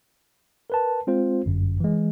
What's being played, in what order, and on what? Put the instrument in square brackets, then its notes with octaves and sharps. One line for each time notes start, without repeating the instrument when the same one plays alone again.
[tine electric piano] A#4 B4 A5
G#3 C4 F4 C5
G1 F#2
E3 G#3